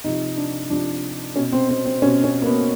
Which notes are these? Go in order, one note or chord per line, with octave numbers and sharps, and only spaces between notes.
C3 F3 D#4
D4
C3 F3 D4
B2 C#4
C4
C4
C4
B2 C#4
C#4
A#3
B3